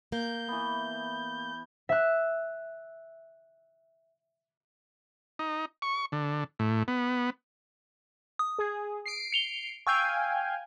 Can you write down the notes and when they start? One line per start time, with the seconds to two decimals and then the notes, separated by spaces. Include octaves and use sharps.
0.12 A#3 G6
0.48 E3 B3
1.89 E5 F#6
5.39 D#4
5.82 C#6
6.12 D3
6.59 A2
6.88 B3
8.39 D#6
8.59 G#4
9.06 C7 D7
9.32 C#7 F7 G7
9.87 F5 G5 G#5 C#6 E6 G6